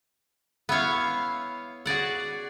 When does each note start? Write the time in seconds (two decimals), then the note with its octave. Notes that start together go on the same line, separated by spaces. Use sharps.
0.69 B3 E4 C#5 F5
1.86 F#4 G#4 D5 F#5